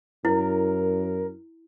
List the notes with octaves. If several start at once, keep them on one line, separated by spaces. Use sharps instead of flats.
F#2 E4 A#4